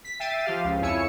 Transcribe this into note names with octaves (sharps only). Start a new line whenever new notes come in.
B6
E5 G5 A6 C7 D#7
F3 G4 F5
C#2
F2 E4 C#5 G#5 E6 C#7